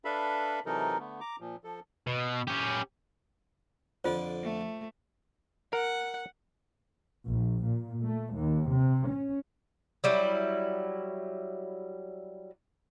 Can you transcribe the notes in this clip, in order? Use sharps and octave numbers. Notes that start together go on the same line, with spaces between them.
D4 A4 B4 E5 F5 B5
C3 E3 F#3 D#4 A4 A#4
D3 A3 B3
A#5 D6
A#2 F3
F3 A4
B2
C#4 G4
F2 D3 D4 F4 C5
A3
A#4 F#5
A#1
A#2
A3
D#2
C3
C#4
F#3 G3 E4